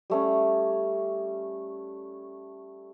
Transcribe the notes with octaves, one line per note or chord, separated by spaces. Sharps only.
G3 A3 C#4